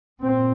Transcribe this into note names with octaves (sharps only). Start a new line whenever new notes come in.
A#2 C4